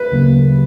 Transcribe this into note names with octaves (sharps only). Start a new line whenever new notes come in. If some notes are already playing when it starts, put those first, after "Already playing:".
Already playing: B4
D2 C#3 F#3 A#3